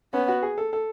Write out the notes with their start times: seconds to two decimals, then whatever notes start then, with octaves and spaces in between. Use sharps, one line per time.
0.13 B3 C#4
0.28 F#4
0.43 G#4
0.58 A4
0.73 A4